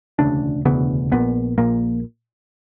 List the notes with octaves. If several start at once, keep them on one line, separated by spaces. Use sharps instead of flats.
E1 D2 C#3 D4
E1 D2 C#3 B3
A#1 A#2 B3
A#1 A#2 A#3